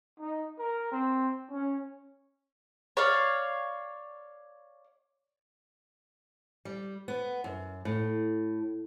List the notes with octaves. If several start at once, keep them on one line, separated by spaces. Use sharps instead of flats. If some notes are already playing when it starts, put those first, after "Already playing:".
D#4
A#4
C4
C#4
C#5 D5 F5
G3
B3
F#2
A2